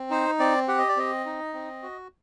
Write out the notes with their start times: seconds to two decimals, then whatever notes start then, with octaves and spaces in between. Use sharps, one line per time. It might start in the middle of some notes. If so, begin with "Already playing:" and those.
Already playing: C4
0.10 D#4 C5
0.39 C4 D5
0.68 G4 F#5
0.78 D#5
0.88 D5
0.96 C4 D#5
1.26 D#4
1.54 C4
1.83 F#4